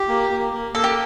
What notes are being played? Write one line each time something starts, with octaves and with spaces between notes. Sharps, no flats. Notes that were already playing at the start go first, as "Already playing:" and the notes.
Already playing: F4 G4
A#3
A#3
A#3
A#3 A4
G4